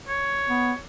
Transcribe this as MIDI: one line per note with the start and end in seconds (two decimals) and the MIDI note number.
0.08 0.79 73
0.49 0.73 59